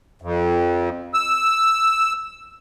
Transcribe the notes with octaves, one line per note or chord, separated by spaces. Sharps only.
F2
E6